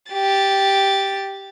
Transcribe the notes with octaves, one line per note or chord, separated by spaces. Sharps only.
G4 A6